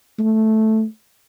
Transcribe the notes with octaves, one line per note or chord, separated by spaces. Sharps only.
A3